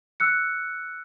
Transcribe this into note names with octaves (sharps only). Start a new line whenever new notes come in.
E6 F#6 C#7